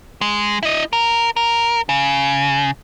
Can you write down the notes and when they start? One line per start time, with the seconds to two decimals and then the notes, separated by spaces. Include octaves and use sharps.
0.21 G#3
0.63 E4 D#5
0.93 A#4
1.36 A#4
1.89 C#3